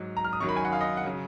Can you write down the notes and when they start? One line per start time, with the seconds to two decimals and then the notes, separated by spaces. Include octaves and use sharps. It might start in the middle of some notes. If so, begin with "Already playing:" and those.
Already playing: G#2 F#3
0.17 A#5
0.25 F6
0.33 D#6
0.40 F#2 D#3 F#3 C#6
0.49 B5
0.57 G#5
0.65 F#5
0.73 F5
0.81 D#5
0.97 F#5
1.05 C#3 F#3